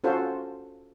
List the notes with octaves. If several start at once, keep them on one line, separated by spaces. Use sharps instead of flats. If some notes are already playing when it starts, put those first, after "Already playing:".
C#4 F4 F#4 A4 C5